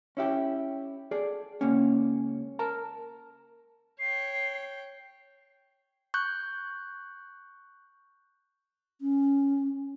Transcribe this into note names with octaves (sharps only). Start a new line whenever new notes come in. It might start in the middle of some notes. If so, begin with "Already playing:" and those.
C#4 E4 G4
G#4 A4 D5
C#2 A#3 C#4
A#4 A5 A#5
C#5 G5 C7
C#6 F#6 G6
C#4